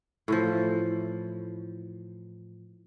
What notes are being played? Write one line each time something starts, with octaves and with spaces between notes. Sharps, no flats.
A2 E3 F3